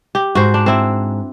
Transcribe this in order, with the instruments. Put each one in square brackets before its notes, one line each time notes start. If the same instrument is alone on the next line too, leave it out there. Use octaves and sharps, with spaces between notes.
[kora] G4
[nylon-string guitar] G#2 [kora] F#4 C5
[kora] D4
C4 E4